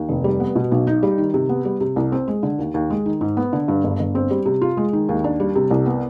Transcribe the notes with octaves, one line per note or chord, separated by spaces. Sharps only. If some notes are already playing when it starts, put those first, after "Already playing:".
Already playing: D#2
F1
G3
B3
B2
B1
D#4
G3
D#3
C3
B3
G3
C3
C2
C4
G#3
D3
D#2
D#2
G#3
D#3
G#2
B3
D3
G2
G1
G1
C4
G3
C3
F4
G#3
D#3
D#2
D4
G3
C3
C2
B3